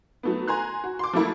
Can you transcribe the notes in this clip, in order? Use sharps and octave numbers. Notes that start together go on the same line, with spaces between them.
F#3 A3 B3
G#5 A#5 C6 F#6
F#4
C6 D6
F3 F#3 A3 A#3 E4